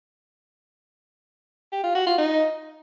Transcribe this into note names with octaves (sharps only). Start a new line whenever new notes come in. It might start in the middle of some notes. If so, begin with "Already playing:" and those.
G4
F4
F#4
F4
D#4